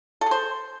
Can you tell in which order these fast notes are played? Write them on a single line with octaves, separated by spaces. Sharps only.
A4 G#4 C5